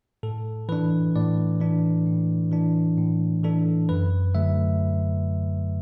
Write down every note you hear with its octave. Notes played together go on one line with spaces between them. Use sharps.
A2 A4
E3 D4 B4
A2 D5
E3 D4
A2
E3 D4
A2
E3 D4 A4
F#2 B4
D3 F#3 A3 E5